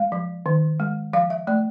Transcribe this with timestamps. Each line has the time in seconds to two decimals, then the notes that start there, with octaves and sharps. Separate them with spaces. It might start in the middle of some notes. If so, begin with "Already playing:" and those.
Already playing: G#3 F5
0.12 F3
0.46 D#3
0.80 G#3
1.13 F3 F5
1.30 E5
1.47 A3 D5